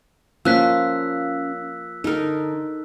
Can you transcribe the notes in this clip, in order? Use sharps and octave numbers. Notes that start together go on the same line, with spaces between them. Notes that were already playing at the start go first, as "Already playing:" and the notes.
F3 A#3 C#4 F4 D5 E6 F#6 B6
D3 D#4 A#4